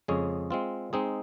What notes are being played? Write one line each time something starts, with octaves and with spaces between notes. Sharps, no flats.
F2 C#3 G#3 C#4 G#4
G#3 C4 F4
G#3 C4 D#4 G#4